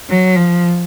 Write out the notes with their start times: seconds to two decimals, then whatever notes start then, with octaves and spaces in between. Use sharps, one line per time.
0.09 F#3
0.36 F3